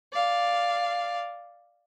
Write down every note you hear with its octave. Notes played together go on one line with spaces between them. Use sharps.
D5 F5